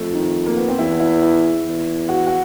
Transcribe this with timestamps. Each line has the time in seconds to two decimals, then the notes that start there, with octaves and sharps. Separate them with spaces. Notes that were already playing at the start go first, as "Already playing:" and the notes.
Already playing: F2 A3
0.13 D#3
0.46 A#3
0.57 B3
0.68 C4
0.79 E2 E4
1.00 E4
1.22 E4
1.66 E2
2.09 F#4
2.27 F#4